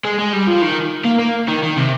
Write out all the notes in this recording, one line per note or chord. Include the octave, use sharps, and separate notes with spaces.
G#3
G#3
G3
F3
D#3
A#3
A#3
D#3
D#3
C3